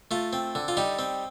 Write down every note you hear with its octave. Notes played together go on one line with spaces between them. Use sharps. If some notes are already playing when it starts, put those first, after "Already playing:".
A3 F4
C4
D3
F4
G3 D#4
C4